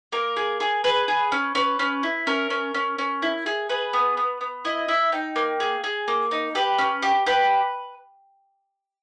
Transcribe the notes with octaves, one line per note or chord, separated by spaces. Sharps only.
A#3 A#4
G#4
G#4
G#4 B4
G#4
C#4
C#4 B4
C#4
E4
C#4 A#4
C#4
C#4
C#4
E4
G#4
G#4 B4
B3
B3
B3
E4 D#5
E4 E5
D#4 G5
A#3
G#4
G#4
A#3
D#4
G4 B4
C#4
G4
G4 B4